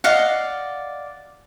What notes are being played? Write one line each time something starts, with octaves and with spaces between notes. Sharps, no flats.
D5 D#5 F5 F#5